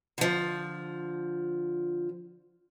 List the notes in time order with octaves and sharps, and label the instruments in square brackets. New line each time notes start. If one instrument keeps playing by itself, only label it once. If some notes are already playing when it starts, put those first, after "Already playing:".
[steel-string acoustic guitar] D3 F3